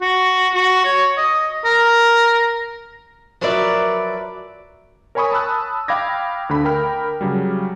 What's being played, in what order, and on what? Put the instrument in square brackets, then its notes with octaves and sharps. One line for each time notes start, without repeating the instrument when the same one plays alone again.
[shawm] F#4
F#4
C#5
D#5
A#4
[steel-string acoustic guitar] F3 F#3 A#4 B4 D5 E5
[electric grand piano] A#4 C#5 G#5 B5 C#6 D#6
A5 B5 E6 F#6
F5 G5 B5 D6 G#6 A#6
D2 D3 B5
A#4 G5 B5 F6
C#3 F#3 G3